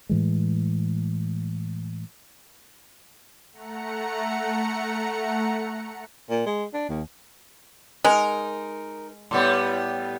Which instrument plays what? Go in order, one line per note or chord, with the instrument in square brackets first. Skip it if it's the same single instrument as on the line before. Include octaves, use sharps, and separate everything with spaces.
[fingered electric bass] A2 E3 G#3
[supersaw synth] A3 F#5 A#5 C#7
[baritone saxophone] A#2
G#3
D4
D#2
[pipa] G#3 [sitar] D#4 A#4
[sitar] A2 G3 B3